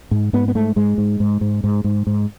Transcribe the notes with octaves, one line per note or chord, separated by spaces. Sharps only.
G#2
G#2 B3
B3
G#2 A3
G#2 G#3
G#2
G#2
G#2
G#2
G#2
G#2